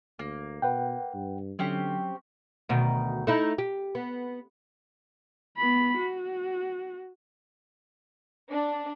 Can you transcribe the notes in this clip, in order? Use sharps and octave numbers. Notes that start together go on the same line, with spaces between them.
D2 A#3
B2 B4 F#5 G5
G2
D3 F#3 C4 C#4 G4
D2 B2 D#3
A3 D#4 E4
G4
B3
B3 B5
F#4
D4